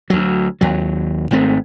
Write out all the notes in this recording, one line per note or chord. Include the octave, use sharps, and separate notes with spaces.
D2 F#3
D#2 F#3
G#1 G#2 A3 C4